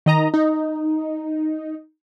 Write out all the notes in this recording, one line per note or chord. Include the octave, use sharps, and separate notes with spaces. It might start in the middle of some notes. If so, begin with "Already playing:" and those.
D#3 D#5 A#5
D#4